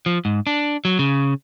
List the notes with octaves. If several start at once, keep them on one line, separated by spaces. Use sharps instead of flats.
F3
G#2
D4
F#3
C#3